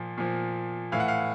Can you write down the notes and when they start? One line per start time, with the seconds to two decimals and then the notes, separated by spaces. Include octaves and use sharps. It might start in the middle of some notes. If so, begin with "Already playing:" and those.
Already playing: A#2 F3
0.18 A#2 F3
0.92 A2 E3 F5
1.00 F#5
1.08 F5